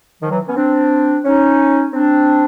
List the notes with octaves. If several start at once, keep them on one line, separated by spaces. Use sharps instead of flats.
D#3 F3
E3 F#3
B3 C#4
C4 D4
C#4 D#4
C4 D4